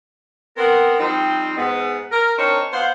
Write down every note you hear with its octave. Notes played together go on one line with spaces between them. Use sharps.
B3 C4 A#4
F3 G3 C4 D#4
G#2 B3
A#4
C4 D4 D#4 A#4 C5 C#5
B3 C5 F5